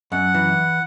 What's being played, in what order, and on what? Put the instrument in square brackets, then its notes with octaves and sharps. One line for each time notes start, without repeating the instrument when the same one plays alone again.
[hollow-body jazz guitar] F#2 [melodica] F#5
[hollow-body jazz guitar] E3